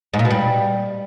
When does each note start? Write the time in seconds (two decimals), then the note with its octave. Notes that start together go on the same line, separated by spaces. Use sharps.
0.14 G#2
0.19 A#2
0.25 B2
0.30 G3